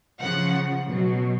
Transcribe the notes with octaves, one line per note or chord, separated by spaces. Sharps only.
C#3 F3 F#5
B2 F#3